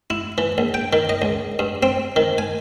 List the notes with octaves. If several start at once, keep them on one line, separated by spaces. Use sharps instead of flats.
E4
E3
A#1
G5
D#3
D#5
C#2
G2
C4
D#3
G#5